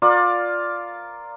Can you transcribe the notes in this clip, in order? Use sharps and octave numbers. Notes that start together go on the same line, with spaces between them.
F4 A#4 D5